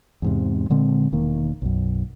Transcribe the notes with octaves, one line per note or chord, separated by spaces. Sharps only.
E2 G#2 C3
A#2 D3 G#3 C4
E1 D#3 A#3
B1 F#2